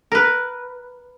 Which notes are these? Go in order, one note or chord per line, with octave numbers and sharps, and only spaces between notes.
A#4 B4